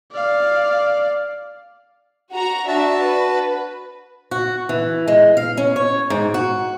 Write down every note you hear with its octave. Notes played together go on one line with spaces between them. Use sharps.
D5 F5
F#4 A#5
D4 F#4 E5 A5
B4
F#4
E3
G#3
F5
C#4
C#5
G#2
F#4